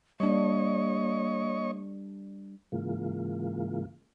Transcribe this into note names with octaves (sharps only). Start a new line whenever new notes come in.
G3 A#3 D4 C#5 D#5 C#6
G#2 C#3 E3 G#3 A#3 F4